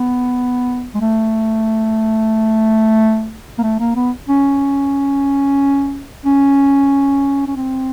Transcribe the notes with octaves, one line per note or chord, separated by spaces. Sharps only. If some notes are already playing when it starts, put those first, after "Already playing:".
Already playing: B3
G#3
A3
A#3
A3
A#3
B3
C#4
C#4
C#4
C4